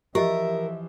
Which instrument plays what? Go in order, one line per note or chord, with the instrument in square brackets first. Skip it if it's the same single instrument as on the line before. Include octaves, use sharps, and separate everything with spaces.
[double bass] E3 F3 [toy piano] G4 D#5 [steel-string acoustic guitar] A#4 [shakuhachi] E5